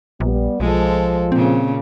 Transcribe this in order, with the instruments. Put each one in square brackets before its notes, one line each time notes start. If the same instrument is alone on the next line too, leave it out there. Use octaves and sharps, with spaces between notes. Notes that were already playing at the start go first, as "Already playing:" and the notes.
[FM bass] A#1 [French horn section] G3 B3
[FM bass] B1 [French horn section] F3 [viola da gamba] G#3 A4
[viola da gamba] A#2 C#3 [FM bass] C4